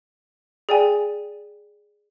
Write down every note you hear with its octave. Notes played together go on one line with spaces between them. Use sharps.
G#4 D5 G5 G#5